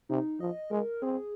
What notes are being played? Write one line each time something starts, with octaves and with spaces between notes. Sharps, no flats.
C3 D#4
F3 D#5
G#3 A#4
C4 G#4